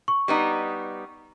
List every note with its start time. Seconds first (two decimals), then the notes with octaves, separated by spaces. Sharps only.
0.08 C#6
0.28 G3 B3 D#4